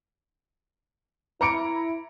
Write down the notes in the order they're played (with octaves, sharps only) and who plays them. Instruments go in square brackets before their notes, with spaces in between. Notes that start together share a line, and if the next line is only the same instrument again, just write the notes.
[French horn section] E4 [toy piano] B4 B5 D6 [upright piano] A#5 C#7 D7